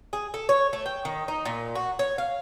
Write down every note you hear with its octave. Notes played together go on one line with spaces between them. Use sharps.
G#4
A4
C#5
A3
G5
D#3
D#4
A#2
F#4
C#5
F5